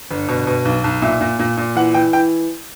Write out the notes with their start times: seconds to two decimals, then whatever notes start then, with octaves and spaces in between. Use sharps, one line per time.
0.11 G1
0.28 B2
0.47 B2
0.65 B1
0.84 B1
1.02 A#2 E5
1.21 A#2
1.39 A#2
1.57 A#2
1.76 E3 F#5
1.94 E3 G5
2.13 E3 G5